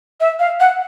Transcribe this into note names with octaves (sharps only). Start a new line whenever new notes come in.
E5
F5
F#5